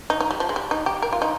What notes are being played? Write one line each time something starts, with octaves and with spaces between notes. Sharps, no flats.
D#4
D#4
G3
F3
G#3
G3
D#4
G4
A#4
F4
D#4